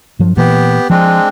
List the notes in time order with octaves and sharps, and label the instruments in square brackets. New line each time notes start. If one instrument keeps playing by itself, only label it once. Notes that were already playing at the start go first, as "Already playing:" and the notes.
[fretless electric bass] G2 F3 F#3
[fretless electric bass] A#2 E3 A#3 [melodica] B3 G4
[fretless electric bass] F3 [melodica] G#3 C4 D4